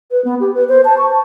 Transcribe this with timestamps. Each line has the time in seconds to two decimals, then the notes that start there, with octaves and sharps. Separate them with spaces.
0.11 B4
0.24 B3
0.40 G4
0.54 B4
0.69 C5
0.85 A5
0.98 C#6
1.10 A5